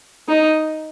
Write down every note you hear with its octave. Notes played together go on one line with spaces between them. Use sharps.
D#4